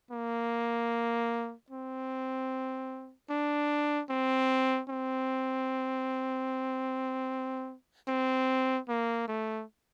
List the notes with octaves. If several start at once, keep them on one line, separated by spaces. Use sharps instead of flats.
A#3
C4
D4
C4
C4
C4
A#3
A3